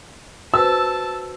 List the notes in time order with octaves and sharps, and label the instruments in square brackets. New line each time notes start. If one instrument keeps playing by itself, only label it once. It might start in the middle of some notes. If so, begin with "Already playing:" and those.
[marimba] F#4 B4 C5 [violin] A5 [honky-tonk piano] E6